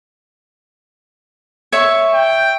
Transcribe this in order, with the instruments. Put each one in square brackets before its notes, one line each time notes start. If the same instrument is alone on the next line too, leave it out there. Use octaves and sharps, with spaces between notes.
[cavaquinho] C#5 E5 C#6
[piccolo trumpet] G5